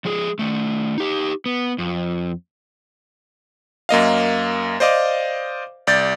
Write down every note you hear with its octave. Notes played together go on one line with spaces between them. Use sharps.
F3 G#3 G#4
D#3 A3
D#4 G4
B3
F2
F#2 A#3 D#5 F5
C5 D5 D#5 F5 D6
C2 D5 G6 A6